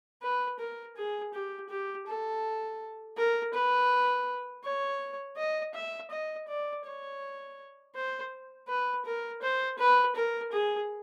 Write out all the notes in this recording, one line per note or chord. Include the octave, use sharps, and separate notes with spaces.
B4
A#4
G#4
G4
G4
A4
A#4
B4
C#5
D#5
E5
D#5
D5
C#5
C5
B4
A#4
C5
B4
A#4
G#4